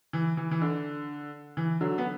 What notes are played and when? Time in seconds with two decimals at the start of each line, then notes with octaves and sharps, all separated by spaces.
0.13 E3
0.37 E3
0.51 E3
0.62 D3
1.57 E3
1.81 D3 F#3
1.98 B3